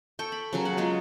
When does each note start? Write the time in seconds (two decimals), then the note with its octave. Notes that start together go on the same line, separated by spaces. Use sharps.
0.19 A4 G5 C#6
0.32 B5
0.53 C#3 F#3 A#4
0.65 F#5
0.77 F#3 G#3 F4 D#5